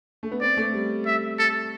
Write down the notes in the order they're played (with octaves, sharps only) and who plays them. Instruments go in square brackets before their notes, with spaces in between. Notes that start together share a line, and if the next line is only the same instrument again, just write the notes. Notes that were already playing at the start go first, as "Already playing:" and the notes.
[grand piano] A3
B3
[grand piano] C4 [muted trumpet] D5
[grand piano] A3
G3
[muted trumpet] E5
A4